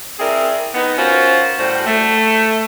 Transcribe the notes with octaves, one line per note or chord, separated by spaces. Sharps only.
C4 E4 G#4 A#4 D5
B3 D#4
C#4 F4 F#4 A#4 C5
A2 G3 F#4 C5
A3